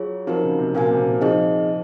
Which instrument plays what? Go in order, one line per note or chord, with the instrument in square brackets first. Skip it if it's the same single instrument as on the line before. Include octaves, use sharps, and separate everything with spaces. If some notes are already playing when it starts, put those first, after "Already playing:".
Already playing: [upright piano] F#3 [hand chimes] F4 G#4 C#5
[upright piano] F3 [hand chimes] C4 D#4 F#4 A#4
[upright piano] C#3
C3
[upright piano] A#2 [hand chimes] F#4 A#4 F5 G#5
[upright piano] C3
C3
[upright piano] F3 [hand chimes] C4 D#4 G#4 D#5